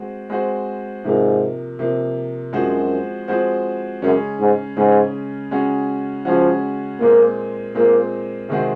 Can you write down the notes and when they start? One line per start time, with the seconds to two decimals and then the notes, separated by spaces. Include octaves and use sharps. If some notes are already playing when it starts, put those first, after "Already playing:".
Already playing: G#3 C4 F#4
0.30 G#3 C4 F#4 C5
1.04 G#2 C3 F3 A#3
1.79 C3 F3 A#3
2.53 F#2 F3 G#3 C4 F#4 C5
3.28 F3 G#3 C4 F#4 C5
4.02 F#2 C#3 G#3 C#4
4.39 G#2
4.76 G#2 C#3 G#3 C#4
5.51 C#3 G#3 C#4 F#4
6.25 C#3 F3 G#3 C#4 F#4
7.00 A#2 G#3 A#3 C4 F4
7.75 A#2 G#3 A#3 C4 F4
8.49 C3 D#3 G#3 C4 F#4